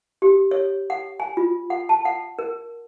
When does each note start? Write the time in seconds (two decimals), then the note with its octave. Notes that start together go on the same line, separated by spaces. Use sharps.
0.22 G4
0.51 C#5
0.90 F#5
1.20 G#5
1.37 F4
1.70 F#5
1.89 A5
2.05 F#5
2.39 A#4